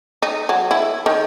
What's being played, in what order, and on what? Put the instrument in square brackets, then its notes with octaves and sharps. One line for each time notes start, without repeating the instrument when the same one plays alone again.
[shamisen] D#4
F#3
E4
D#3